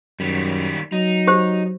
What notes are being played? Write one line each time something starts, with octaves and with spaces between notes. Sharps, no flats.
F#2 D#3 G3
F#3 D#4
G4 C5